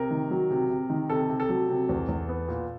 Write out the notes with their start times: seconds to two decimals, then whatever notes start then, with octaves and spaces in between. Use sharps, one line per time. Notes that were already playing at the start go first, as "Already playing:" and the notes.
Already playing: C3 A#4
0.11 D#3
0.31 F#3
0.50 C3
0.70 C3
0.90 D#3
1.10 C3 A4
1.30 C3
1.40 A4
1.49 F#3
1.69 C3
1.89 E2
2.09 E2
2.29 B3
2.48 A#2